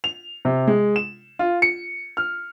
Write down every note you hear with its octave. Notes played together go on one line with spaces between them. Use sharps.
F7
C3
G#3
E7
F4
C#7
F6